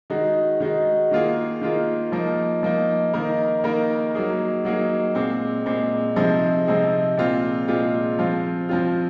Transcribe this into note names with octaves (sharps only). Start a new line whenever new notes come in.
D#3 G#3 D#4 F#4
D#3 G#3 D#4 F#4
D#3 A#3 F4 G#4
D#3 A#3 F4 G#4
F3 A#3 D#4
F3 A#3 D#4
D#3 A#3 D#4 A#4
D#3 A#3 D#4 A#4
F#3 A#3 D#4 G#4
F#3 A#3 D#4 G#4
A#2 G#3 C4
A#2 G#3 C4
C3 F3 C4 D#4 G#4
C3 F3 C4 D#4 G#4
A#2 G#3 C4 F4
A#2 G#3 C4 F4
F3 C4 F4
F3 C4 F4